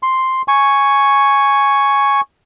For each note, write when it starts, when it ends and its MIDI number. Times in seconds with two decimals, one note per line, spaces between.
0.03 0.42 84
0.48 2.21 80
0.48 2.21 85